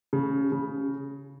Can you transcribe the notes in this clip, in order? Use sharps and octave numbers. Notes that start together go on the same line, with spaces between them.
C#3
C#3